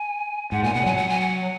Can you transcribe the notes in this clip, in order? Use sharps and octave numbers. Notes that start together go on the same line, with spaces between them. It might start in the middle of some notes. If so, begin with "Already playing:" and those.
Already playing: G#5
G#2 F#5
A#2 G#5
B2 F#5
F#3 G#5
F#5
G#5
F#5